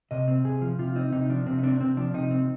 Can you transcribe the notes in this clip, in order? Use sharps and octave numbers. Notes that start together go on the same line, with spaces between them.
C3 D#5
C4
C3 G#4
F3
C3 F4
C4 D#4
C3 D#4
F3 D4
C3 C4
D#4
C4 D4
C3 C4
F3 D4
C3 D#4
C4